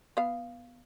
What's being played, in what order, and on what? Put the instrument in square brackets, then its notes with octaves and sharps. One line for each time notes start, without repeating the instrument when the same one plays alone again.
[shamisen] B3 F5